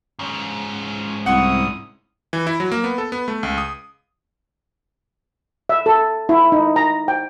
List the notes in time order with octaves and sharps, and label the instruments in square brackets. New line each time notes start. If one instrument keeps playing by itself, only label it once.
[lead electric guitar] G#2 C#4
[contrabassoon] C2 [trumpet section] E4 D#6 [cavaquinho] F#5 C6 C#6
[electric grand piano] E3
E4
F#3
A#3
B3
A4
B3
A3
C#2
D#6
[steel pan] E5
A4
E4
D#4
A#5
G5